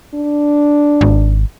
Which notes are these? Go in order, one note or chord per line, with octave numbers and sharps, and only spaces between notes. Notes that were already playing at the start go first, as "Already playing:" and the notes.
D4
G#1